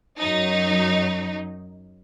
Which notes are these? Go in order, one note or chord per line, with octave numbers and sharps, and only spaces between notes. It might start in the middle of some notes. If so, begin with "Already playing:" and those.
F#2 F#3 D#4